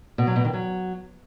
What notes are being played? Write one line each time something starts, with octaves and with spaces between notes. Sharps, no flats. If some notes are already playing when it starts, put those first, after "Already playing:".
B2
F#3
B2
D#3
F#3